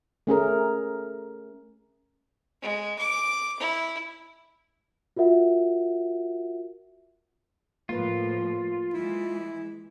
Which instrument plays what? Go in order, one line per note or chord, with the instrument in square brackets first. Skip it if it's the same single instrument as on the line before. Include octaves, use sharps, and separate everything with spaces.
[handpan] A3 C#4 G#4 A#4
[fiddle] G#3
D6
E4
[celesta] F4 F#4 A#4 E5 F#5
[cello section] A2 F3 [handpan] A#3 B4 [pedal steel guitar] F4
[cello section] E3 G#3 [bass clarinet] E4